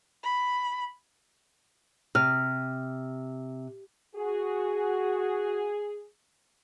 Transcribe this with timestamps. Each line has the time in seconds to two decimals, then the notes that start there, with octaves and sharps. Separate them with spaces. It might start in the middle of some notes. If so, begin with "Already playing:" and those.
0.24 B5
2.15 C3 F6
4.16 F#4 G#4